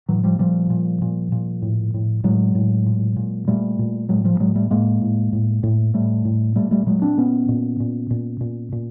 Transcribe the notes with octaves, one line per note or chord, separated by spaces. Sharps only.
A2 E3 F#3
F3 G3
A#2 F3 G3
A#2
A#2
A#2
A2
A2
A2 F#3 G#3
A2
A#2
A#2
A#2 G3 A3
A#2
A2 F#3 G#3
F3 G3
G3
A2 F#3 G#3
G3 A3
A2 G#3 A#3
A2
A2
A2
A2 G3 A3
A2
A#2 G3 A3
G3 A3
A#2 F#3 G#3
C4 D4
A#2 B3 C#4
A#2
A#2
A#2
A#2
A#2